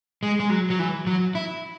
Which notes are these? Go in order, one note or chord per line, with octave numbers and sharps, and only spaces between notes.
G#3
G#3
F#3
F#3
E3
F#3
E4